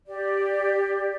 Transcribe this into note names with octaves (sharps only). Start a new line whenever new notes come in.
G4 D5